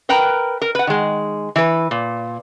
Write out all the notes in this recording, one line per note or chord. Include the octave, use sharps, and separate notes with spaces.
A#4 B4 G5 A#5
A#4
B4 F#5
D#3 G#3
E3 B4
A#2